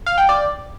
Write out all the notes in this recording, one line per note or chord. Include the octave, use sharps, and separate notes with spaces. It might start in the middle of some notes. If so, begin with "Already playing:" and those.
F5
G5
D5